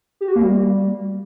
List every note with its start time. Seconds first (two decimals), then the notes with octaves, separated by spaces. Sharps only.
0.21 G4
0.28 F#4
0.36 A#3
0.43 G3